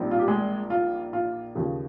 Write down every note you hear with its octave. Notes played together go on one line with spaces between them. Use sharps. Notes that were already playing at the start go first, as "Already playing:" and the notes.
Already playing: A#1 A#2 G3 C4 D#4
F4
G4
G#3 G#4
F4
F4
D#2 C#3 F3